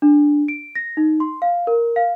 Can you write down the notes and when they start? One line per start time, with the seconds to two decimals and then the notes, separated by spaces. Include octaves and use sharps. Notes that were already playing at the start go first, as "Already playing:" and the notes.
0.02 D4
0.48 D7
0.75 A#6
0.97 D#4
1.20 C6
1.42 F5
1.67 A#4
1.96 F5